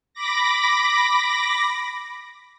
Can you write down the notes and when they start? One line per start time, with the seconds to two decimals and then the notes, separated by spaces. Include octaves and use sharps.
0.14 B5 D6 A#6